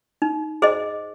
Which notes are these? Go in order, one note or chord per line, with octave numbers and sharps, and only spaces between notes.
D#4
G#4 C5 D#5